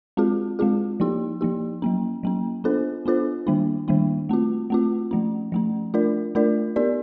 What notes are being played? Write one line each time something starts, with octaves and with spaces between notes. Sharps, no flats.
G#3 C4 F4 G#4
G#3 C4 F4 G#4
F3 A#3 D#4 G4
F3 A#3 D#4 G4
F#3 A#3 C#4
F#3 A#3 C#4
B3 D4 F4 A4 C5
B3 D4 F4 A4 C5
D#3 G3 A#3 D4
D#3 G3 A#3 D4
A3 C4 F4
A3 C4 F4
F3 A3 C#4
F3 A3 C#4
A3 D4 F4 A#4 D5
A3 D4 F4 A#4 D5
B3 D#4 G4 A#4 D5